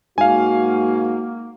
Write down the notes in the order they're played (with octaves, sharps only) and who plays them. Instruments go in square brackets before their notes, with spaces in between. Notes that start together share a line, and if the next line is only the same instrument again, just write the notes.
[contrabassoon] G#2 [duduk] A#3 [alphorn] F#4 [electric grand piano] F5 G#5